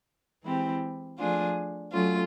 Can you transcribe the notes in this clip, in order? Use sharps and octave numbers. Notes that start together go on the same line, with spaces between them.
E3 G#3 C4 E4 G4
F3 A3 D4 F4 G#4
F#3 A3 C#4 F4